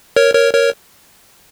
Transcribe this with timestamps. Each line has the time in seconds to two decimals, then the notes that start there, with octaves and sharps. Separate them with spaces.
0.16 A#4 C#5
0.34 A#4 C#5
0.54 A#4 C#5